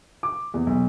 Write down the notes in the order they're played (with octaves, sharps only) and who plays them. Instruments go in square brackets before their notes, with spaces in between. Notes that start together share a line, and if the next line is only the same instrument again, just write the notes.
[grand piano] D6
E2
B1